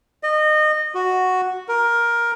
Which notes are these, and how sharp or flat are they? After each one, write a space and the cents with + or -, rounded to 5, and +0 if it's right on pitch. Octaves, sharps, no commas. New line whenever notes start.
D#5 -25
F#4 +0
A#4 +15